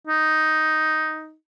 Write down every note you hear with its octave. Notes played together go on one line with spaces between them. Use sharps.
D#4